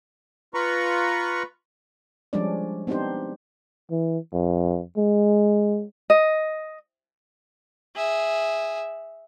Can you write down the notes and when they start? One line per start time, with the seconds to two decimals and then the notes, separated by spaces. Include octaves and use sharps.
0.54 F4 B4 A#5 B5 C#6
2.33 F3 G3 G#3 C#4 D4 D5
2.87 B3 C4 D4 D#4 G4 C5
3.91 E3
4.33 F2
4.97 G#3
6.10 D#5
7.96 G#4 E5